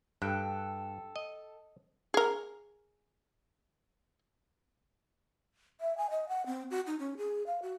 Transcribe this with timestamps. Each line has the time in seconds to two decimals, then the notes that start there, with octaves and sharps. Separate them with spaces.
0.22 G2 A4 G5 F#6
1.16 D#5
2.14 G#4 A#4
5.81 E5
5.98 G#5
6.10 D#5
6.29 F#5
6.46 C4
6.71 F#4
6.87 D#4
6.99 C#4
7.17 G#4
7.46 F5
7.62 F#4